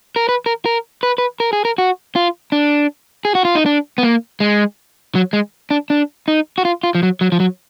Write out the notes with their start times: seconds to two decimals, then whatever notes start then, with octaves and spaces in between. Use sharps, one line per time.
0.16 A#4
0.29 B4
0.46 A#4
0.66 A#4
1.03 B4
1.18 B4
1.40 A#4
1.53 G#4
1.65 A#4
1.78 F#4
2.16 F4
2.52 D4
3.25 G#4
3.35 F#4
3.45 F4
3.55 D#4
3.66 D4
3.98 B3
4.03 A#3
4.40 G#3
5.15 F#3
5.33 G#3
5.71 D4
5.90 D4
6.28 D#4
6.58 F#4
6.65 F4
6.83 F4
6.95 F3
7.03 F#3
7.21 F#3
7.32 F3
7.40 F#3